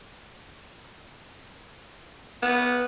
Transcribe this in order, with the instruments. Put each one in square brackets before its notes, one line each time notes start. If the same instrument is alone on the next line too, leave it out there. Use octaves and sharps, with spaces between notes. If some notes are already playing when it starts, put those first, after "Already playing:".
[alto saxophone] B3